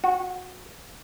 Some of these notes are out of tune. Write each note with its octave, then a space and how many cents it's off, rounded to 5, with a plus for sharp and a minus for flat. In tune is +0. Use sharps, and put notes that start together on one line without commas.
F#4 -20